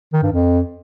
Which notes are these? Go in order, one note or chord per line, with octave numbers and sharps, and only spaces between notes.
D#3
G2
F2